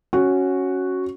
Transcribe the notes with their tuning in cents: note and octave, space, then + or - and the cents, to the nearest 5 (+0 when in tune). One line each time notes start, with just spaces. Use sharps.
C#4 -5 F#4 +0